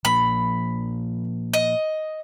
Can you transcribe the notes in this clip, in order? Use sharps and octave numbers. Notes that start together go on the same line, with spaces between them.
A#2 F3 A#3 B5
D#5